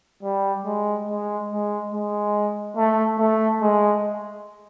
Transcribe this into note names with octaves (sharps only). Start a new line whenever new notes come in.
G3
G#3
G#3
G#3
G#3
A3
A3
G#3